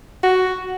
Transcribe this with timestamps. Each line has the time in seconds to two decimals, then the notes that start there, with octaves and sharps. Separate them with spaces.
0.23 F#4